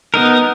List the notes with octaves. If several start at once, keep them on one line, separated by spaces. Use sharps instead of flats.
B3 D#4 A#4